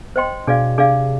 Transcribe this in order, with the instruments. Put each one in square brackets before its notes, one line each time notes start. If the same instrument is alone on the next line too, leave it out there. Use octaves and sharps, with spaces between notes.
[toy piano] C5 D#5 G5 C6
[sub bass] B2 [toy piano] D4 G#4 D5 F5
[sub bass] C3 [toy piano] D4 G#4 D5 F5